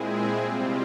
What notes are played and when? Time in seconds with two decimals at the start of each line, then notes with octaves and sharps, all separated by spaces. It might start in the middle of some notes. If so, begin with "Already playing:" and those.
Already playing: A#2 G#3 C4 E4 G#4
0.38 C3 G3 C4 F4